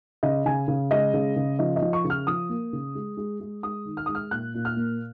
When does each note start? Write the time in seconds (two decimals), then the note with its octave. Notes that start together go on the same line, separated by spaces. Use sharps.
0.23 C#3 D#5
0.46 C#3 G#5
0.68 C#3
0.91 G#3 D#5
1.14 C#3
1.36 C#3
1.59 F3 D#5
1.76 D#5
1.82 F3
1.93 C#6
2.04 C#3
2.10 F6
2.27 F3 D#6
2.49 A#3
2.73 C#3
2.95 G#3
3.17 G#3
3.40 G#3
3.63 G#3 D#6
3.85 D#3
3.97 F6
4.06 G#3 D#6
4.15 F6
4.31 A#2 F#6
4.54 A#2
4.65 F6
4.77 A#3